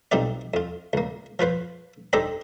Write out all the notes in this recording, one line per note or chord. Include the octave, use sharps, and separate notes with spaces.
B1 G3 C4 D#4 F4 D5
F2 F4
C#2 A#3
F3 F4 B4 C5
D4 D#4 G4 A4 C5 D#5